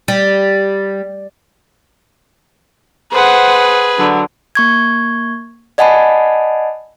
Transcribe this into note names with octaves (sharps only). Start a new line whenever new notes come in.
G3
G#4 B4 C5 F#5
D3 F#3
A#3 C#6 G#6
D5 D#5 F#5 G#5 A5 B5